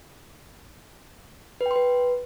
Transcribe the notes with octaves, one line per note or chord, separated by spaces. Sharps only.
B4
G5
C6
B4